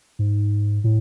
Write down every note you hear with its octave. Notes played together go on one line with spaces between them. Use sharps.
G#2
A2